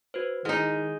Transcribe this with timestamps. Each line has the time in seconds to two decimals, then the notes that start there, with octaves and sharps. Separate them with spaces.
0.14 F#4 B4 C5
0.45 D#3 G#3 D#4 E4 F#5 F6